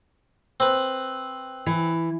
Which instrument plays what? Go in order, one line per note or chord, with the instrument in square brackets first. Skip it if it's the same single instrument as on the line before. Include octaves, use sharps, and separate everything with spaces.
[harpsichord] C4 B4
[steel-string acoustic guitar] E3